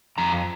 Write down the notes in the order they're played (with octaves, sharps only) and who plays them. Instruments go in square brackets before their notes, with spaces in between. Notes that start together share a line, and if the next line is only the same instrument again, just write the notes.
[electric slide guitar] F2 A#5